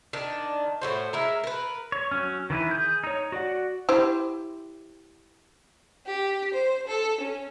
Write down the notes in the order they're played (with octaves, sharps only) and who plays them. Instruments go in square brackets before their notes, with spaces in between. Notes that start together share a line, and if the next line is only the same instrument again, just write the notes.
[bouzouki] D#3 D4
A2 F#4 C5
G#3 E4 A#4
A#4 B4
[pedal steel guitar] C#5
F#3 C#4
D#3 E3 E4 B4
G#4 G6
D#4 C#5
F#4 D5 F#5
[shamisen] E4 G4 C5
[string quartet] G4
C5
A4
C#4